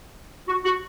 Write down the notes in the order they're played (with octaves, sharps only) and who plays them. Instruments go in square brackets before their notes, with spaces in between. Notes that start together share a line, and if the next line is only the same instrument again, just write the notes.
[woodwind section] F#4
F#4